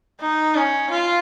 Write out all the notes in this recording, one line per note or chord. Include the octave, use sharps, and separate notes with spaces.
D#4
C#4
F4